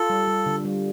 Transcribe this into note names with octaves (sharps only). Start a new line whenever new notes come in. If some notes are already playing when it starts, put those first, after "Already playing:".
Already playing: F4 A4
G3
G3
D3
G3